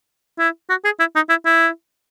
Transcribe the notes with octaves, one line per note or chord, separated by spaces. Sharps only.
E4
F#4
G#4
E4
D#4
E4
E4